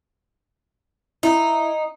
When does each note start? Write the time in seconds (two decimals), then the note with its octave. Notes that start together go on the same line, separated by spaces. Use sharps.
1.23 D#4 E4